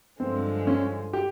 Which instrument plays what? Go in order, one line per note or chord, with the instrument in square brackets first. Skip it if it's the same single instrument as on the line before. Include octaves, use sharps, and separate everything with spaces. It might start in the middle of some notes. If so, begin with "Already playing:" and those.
[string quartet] G2 D3 F3 G#3 [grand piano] C4
[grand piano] C#4
G4